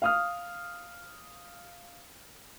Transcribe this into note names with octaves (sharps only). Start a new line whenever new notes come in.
F5 D#6 F6